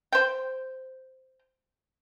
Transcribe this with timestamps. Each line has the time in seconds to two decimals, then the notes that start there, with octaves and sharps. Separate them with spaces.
0.12 C5 G5